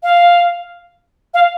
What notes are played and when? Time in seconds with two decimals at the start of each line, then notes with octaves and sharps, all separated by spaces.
0.03 F5
1.34 F5